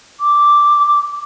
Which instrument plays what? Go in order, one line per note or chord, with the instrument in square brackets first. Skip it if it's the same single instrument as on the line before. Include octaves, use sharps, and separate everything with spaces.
[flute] D6